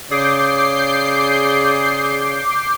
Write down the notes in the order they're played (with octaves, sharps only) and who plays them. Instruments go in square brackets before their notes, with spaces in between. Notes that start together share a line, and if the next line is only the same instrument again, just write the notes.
[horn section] C#3 G#4 D5 [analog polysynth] D6 G6 C7